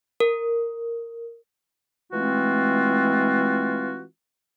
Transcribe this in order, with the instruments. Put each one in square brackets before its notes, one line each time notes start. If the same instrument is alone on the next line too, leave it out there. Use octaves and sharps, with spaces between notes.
[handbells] A#4
[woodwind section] E3 G#3 A3 C4 F4 F#4